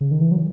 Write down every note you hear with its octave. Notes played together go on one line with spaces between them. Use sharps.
C#3
D#3
E3
F#3